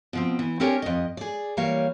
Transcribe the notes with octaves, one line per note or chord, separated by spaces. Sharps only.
B2 F3 C4
E3
C4 D4 G4 A#4 C#5 G#5
F2 D#5
G#4 D5
E3 G3 A#3 C#5 F5